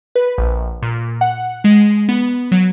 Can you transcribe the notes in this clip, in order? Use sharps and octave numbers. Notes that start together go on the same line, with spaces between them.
B4
A#1
A#2
F#5
G#3
B3
F#3